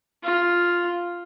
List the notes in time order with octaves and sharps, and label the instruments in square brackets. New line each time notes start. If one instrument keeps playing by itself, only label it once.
[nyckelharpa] F4